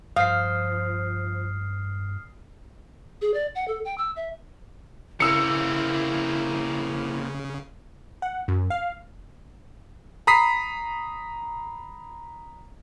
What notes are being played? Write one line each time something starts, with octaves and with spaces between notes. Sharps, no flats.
G2 F3 F5 D#6 F6 C7
G#4
D5
F#5
A4
G5
E6
E5
C#3 A#3 C4 E4 E6 C#7
F#5
F#2
F5
A#5 B5 D#6 B6 C7